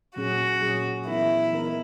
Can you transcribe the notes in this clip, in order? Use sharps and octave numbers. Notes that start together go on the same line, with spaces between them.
A#2 F#3 C#4 F#4 G#4
A#2 F#3 C#4 G#4
E3 B3 D#4 E4 A#4
E3 B3 D#4 A#4